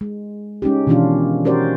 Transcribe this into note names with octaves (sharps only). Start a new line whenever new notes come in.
G#3
G#3 C#4 D#4 G4
B2 D#3 E3 C#4 D4 F4
C#4 F#4 G4 A#4 C5 D5